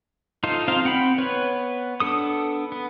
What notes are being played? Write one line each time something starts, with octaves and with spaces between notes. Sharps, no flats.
D#4 F4 A4 C5
C4 D#4 F4 C5 F5
C4 F#5 G5 B5
B3 B4 C#5
B3 D4 A4 D#6
B3